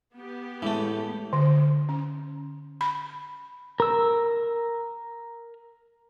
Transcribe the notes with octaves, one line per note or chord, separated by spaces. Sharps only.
B3 G4
A2 E3 G#3 A3
D3
C#4
B5
A#4 E6